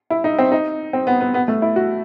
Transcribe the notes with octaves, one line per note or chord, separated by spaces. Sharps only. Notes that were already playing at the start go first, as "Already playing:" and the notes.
E4
D#4
C4
D#4
C4
B3
B3
B3
A3
E4
F#4